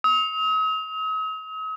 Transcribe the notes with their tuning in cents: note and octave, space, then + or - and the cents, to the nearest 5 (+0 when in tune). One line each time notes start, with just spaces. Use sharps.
D#6 +45